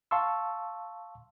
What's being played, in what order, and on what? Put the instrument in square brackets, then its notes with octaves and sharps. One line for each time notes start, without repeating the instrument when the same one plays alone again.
[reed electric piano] F5 A5 C6 C#6 E6